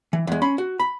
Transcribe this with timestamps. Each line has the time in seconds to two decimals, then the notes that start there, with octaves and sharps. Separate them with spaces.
0.13 E3
0.27 E2 G#3
0.42 C#4 B5 C6
0.58 F#4
0.79 B5